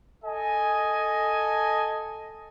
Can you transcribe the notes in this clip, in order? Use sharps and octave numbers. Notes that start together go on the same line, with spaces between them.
A4 D#5 G#5